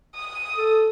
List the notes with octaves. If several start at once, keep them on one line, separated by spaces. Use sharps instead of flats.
D#6
A4